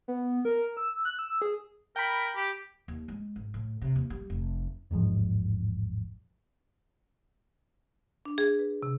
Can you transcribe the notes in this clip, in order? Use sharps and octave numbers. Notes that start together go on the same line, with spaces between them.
B3
A#4
E6
F#6
E6
G#4
A#4 G5 B5
G4
D#2
G#3
G#1
A2
C3
D#2
G3
F1
E1 A1 G#2 F3
D4
G#4
B4
C3